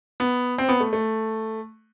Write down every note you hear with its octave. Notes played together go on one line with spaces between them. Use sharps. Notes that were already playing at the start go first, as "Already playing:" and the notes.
B3
C4
B3
A3
A3